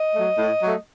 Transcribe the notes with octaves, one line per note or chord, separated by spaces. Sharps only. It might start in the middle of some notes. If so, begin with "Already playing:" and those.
Already playing: D#5
F#3 A3
A2
F#3 A3